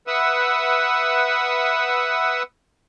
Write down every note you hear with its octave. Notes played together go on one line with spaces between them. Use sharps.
B4 E5 F#5 D#6 E6